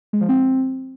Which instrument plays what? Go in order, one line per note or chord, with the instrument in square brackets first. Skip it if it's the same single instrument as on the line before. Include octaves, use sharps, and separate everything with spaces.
[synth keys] G#3
F3
C4